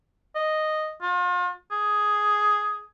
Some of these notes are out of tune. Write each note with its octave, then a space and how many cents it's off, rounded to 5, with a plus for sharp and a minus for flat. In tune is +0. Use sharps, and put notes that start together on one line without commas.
D#5 -5
F4 +40
G#4 +5